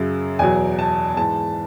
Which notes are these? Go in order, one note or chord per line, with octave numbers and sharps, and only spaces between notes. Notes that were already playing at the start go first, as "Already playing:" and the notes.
Already playing: F#2 C#3 F#3
E2 B2 F#3 G#5
A5
G#2 E3 A5